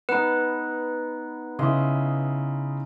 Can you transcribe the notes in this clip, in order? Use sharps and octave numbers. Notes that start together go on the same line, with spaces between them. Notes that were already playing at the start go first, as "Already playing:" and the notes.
B3 D#4 B4
C#3 E4 D#5 C6